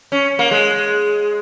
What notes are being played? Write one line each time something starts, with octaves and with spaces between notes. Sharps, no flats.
C#4
A#3
G#3